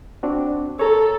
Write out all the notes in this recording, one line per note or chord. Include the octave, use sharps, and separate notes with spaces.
C4 D4 F#4
A4 C#5 A#5